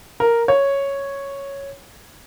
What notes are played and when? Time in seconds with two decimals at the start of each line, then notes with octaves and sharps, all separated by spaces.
0.20 A#4
0.48 C#5